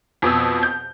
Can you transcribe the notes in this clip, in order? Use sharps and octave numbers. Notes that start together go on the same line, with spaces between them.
F2 B2 D#6 E6
G6